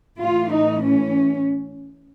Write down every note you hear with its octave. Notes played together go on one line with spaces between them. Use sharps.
A2 E3 F4
D#4
C#4